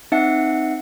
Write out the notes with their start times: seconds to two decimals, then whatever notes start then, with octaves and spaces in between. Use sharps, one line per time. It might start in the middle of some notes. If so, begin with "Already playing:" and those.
0.12 C4 D#4 E5 F#5 C#7